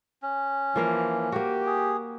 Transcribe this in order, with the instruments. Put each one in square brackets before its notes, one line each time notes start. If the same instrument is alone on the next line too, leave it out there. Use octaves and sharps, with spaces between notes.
[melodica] C#4
[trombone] E3 [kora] F3 A#3 F5
[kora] A#3 F#4 [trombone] G4
[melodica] G#4